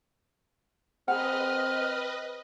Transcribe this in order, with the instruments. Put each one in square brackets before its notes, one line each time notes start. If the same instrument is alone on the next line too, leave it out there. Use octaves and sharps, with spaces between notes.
[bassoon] C4 [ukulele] G#4 A#4 F#5 [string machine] B4 D#5 [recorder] F6